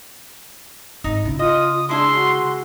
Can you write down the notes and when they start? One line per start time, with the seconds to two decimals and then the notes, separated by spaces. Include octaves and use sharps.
1.04 G#1 D#4
1.25 C#3 E4
1.39 F4 D#5 D#6
1.89 G#3 D4 E4 G#4 C6
2.12 F#4